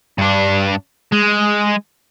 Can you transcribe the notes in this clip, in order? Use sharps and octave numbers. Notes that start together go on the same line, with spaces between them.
G2 D4
G#3